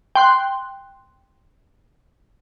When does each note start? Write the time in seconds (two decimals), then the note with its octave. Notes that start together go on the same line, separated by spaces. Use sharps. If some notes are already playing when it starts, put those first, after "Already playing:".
0.15 G5 C6 F#6